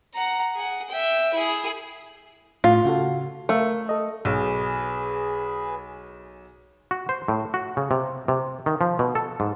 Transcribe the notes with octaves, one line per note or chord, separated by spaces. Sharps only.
F#5 A#5
G#4 F#5
E5 G5
E4 G#4
A2 F4
C#3 F#4 A4
A3 A#4 F5
A4 D#5
B1 G#4 B4
F#4
C5
A2
F#4
C#3
C3
C3
D#3
F3
B2
A4
G#2